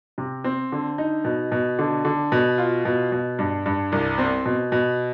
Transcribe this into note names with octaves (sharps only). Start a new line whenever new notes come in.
C3
C4
D3
D#4
B2
B2
D3
D3
B2
F4
B2
B2
G2
G2
C2
C4
B2
B2